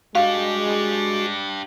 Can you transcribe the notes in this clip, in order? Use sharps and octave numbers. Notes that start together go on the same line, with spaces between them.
G#3 D4 F#4 G4 F5